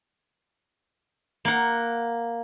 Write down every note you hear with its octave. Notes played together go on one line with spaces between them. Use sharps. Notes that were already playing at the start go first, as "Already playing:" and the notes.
A#3 F#5